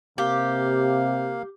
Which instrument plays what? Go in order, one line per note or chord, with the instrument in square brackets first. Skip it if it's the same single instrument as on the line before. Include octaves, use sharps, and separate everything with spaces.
[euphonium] C3 [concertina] A#3 F5 [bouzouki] G4